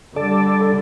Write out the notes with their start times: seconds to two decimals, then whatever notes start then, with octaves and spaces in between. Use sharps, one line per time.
0.16 D3 G3 A4 D5